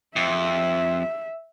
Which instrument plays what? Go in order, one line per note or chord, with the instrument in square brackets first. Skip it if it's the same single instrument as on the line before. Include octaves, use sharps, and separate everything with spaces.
[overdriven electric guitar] F2 [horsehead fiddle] E5